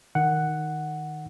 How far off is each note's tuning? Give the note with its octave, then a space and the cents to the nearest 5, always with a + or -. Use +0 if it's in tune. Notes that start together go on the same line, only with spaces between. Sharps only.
D#3 +0 F#5 +0